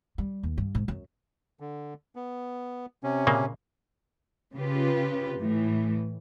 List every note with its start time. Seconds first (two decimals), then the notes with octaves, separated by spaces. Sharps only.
0.18 G3
0.43 D#2
0.58 G2
0.75 G#2
0.88 F#2
1.60 D3
2.16 B3
3.03 C3 C#4
3.27 A#2 C#3 A#3
4.54 C#3 F4 G4 B4
5.39 A2 E3